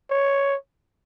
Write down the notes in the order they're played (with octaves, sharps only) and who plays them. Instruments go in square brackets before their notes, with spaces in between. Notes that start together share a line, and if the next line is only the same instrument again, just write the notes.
[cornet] C#5